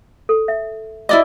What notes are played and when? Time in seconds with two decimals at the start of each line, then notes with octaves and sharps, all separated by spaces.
0.29 A4
0.48 E5
1.09 E4 F#4 D5 D#5 C6 D6